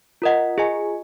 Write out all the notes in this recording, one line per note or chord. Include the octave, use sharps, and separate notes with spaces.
F4 A#4 D#5 F#5
F4 G#4 D#5 G#5